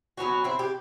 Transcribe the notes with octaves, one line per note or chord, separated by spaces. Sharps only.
F#3 B3 C#4 F#4
C4 E4
G4